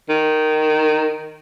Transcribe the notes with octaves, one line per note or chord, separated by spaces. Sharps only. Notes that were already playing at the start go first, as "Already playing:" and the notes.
D#3